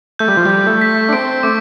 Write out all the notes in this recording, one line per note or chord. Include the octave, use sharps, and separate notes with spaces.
A3 G6
G3
F3
G3 G6
A3
B6
D4
C4 D7
A3 D6